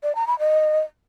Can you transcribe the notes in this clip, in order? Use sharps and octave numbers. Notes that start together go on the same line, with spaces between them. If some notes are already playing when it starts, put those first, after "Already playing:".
D5
A#5
B5
D#5